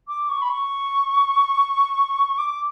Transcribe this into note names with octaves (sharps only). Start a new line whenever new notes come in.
D6
C#6
B5
C#6
D6